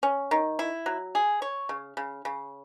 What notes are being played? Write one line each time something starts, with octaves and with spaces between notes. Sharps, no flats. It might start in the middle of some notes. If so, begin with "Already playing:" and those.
C#4
D#3
E4
F#3
G#4
C#5
C#3
C#3
C#3